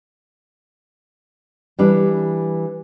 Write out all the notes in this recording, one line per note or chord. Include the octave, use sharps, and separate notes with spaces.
E3 G3 D4